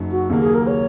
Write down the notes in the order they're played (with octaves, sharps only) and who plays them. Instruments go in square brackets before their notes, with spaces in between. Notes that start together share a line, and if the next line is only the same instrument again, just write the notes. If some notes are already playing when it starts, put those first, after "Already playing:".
Already playing: [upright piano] F#1 F#2 F#3 D#4
[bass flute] F#4
[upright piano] D#2 C#3 F#3 A#3
[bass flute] G#4
A#4
C#5